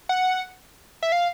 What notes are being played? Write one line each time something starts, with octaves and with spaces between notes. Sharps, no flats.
F#5
E5
F5